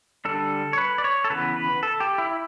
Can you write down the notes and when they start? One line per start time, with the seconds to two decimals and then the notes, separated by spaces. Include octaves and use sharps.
0.25 D3 G3 D4 A4
0.73 C#5
0.78 B4
0.98 D5
1.04 C#5
1.24 A4
1.30 C#3 E3 B3 B4
1.56 B4
1.83 A4
2.00 G4
2.18 E4